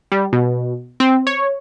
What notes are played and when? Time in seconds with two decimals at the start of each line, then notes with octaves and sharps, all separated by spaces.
0.12 G3
0.33 B2
1.00 C4
1.27 C#5